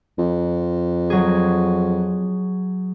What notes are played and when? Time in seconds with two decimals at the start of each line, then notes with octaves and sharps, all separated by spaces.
0.19 F2
1.10 F#3 G#4